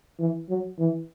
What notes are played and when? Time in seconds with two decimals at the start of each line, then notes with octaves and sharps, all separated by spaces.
0.19 E3
0.49 F#3
0.79 E3